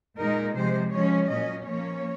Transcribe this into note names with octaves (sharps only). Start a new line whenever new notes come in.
A#2 G#3 D#4 A#4
C3 F3 G#3 C5
F3 G#3 C#4 C#5
A#2 F#3 C#4 D#5
F3 A#3 C#4 C#5